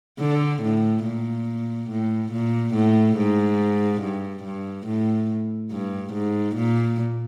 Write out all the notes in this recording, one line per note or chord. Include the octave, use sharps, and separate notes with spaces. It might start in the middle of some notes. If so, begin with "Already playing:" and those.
D3
A2
A#2
A2
A#2
A2
G#2
G2
G2
A2
G2
G#2
A#2